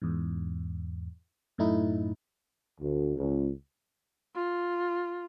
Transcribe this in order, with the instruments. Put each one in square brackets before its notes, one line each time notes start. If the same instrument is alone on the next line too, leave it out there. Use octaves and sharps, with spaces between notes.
[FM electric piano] E2 G#2
F#2 A2 A3 D#4 E4
[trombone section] D2
C#2
[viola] F4